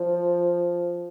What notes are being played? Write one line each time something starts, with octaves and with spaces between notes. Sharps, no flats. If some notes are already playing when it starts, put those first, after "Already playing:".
Already playing: F3